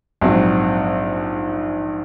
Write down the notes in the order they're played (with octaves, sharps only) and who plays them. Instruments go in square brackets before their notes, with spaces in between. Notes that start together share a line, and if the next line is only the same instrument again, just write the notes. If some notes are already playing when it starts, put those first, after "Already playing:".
[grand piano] A#1 G#2 F#3 C4